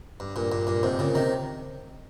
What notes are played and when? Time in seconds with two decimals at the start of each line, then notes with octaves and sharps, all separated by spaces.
0.20 G2
0.36 G2 A#2
0.52 G2 A#2
0.67 G2 A#2
0.83 G#2 C3
0.99 A#2 C#3
1.15 C3 D#3